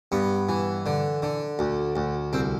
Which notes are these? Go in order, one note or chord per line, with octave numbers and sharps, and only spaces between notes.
G2 B3
E3
D3
D3
D2
D2
C2 C4